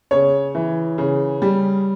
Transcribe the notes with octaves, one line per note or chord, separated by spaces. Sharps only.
C#3 C#5
E3
C#3
G3